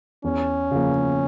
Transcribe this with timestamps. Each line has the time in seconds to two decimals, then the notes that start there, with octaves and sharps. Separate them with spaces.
0.24 E2 C#4
0.71 C#3 F3 A#3